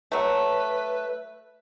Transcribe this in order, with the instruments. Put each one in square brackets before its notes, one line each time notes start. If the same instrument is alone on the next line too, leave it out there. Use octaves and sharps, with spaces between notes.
[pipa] F#3 A3 [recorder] B4